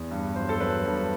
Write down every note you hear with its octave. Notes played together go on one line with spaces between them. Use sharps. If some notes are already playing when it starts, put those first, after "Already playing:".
Already playing: E2
G2
F#3 C5
A4
F#3 B4
G2